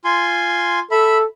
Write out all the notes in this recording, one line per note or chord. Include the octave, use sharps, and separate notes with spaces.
F4 G#5 C6
A4 E5 B5